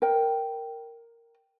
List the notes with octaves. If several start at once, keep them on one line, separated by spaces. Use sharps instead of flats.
A#4 G5